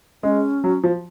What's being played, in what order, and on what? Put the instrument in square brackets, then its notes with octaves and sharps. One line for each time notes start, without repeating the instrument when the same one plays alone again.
[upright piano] G#3 [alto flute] C#4
[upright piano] F#3
F3